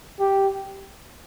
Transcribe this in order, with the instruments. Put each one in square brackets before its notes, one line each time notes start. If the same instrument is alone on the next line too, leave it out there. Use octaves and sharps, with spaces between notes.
[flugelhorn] G4